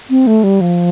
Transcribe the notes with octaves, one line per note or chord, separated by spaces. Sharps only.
C4
A3
G3
F3